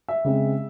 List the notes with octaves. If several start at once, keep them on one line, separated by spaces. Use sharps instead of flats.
E5
C#3 G#3 C4